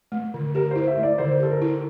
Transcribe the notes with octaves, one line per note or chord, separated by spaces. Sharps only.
A3
D3
G4 A#4
E4 C5
E5
A3
D5
D3 C5
G4 A4
A#4
E4